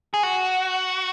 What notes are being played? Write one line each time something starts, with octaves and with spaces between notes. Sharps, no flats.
G#4
F#4